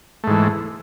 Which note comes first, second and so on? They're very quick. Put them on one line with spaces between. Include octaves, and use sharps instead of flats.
A3 G#2 E3